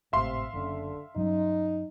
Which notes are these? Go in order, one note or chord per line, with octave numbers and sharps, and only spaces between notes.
G#1 A2 C3 E5 F5 C6
F#1 D3 C#4
G2 F#3 C#4 D#4